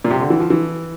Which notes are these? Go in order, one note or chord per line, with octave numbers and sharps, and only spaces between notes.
A#2
C3
D3
E3
F3
E3